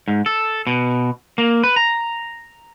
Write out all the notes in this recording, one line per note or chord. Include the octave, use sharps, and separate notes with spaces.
G#2
A4
B2
A#3
B4
A#5